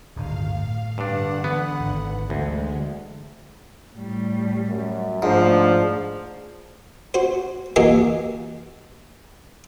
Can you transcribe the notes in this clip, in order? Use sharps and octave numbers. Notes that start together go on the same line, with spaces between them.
D1 G1 D#3 F5
A2
G2 D3 D4 F#5
E3 B3
G#1
D2 D3 E3 G#3
A2 G3
F#2
G#2 F3 A3 D4
F#4 C5
E3 A#3 F#4 G4 D#5 G#5